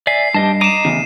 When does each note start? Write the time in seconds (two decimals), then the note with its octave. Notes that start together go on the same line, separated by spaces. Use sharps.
0.07 D5 E5 G#5 C7
0.34 G2 G4 D#5 A5
0.61 D#5 A#5 D6 D#7 E7
0.85 E2 C#3